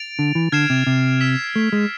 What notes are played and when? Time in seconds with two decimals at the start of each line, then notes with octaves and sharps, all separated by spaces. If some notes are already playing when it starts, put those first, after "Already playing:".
Already playing: A6 D7 F7
0.19 D3
0.35 E3
0.52 D3 F6 G#6 C7 E7
0.70 C3
0.87 C3
1.21 E6 B6 E7
1.56 A3
1.73 G#3